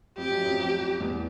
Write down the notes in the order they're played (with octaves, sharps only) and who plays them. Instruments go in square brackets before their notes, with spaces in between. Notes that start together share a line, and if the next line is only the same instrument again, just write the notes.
[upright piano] F2 [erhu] G4
[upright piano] F#2
F2
F2
E2